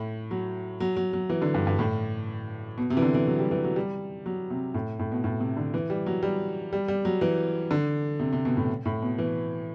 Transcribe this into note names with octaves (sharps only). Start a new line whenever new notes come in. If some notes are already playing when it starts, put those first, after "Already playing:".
Already playing: A2
F#3
F#3
F#3
F#3
E3
D3
G2
G2
A2
B2
C3
E3
D3
E3
F#3
G3
E3
F#3
G3
F#3
C3
A2
A2
B2
A2
C3
D3
E3
G3
F#3
G3
G3
G3
F#3
E3
D3
C3
C3
B2
A2
A2
B2
E3